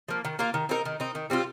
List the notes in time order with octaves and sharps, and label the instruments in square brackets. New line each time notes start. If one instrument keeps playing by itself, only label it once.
[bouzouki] F3 A#3
D#3
A#3 F4 A#4
D#3
C4 D#4 A#4
D#3
C4 D#4
D#3
G3 C4 F4